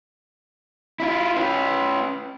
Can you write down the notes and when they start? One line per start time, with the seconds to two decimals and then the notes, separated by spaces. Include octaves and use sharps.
1.00 E4 F4
1.36 C#4 B4